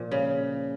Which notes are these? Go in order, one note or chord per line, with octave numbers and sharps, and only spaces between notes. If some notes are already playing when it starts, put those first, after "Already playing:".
Already playing: A#2 F3
C#3